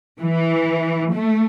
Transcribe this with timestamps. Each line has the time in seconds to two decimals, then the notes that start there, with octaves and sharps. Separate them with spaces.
0.21 E3
1.13 A3